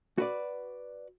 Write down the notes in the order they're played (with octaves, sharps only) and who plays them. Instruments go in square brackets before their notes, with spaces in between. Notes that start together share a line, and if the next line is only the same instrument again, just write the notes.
[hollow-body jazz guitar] F#4 B4 D5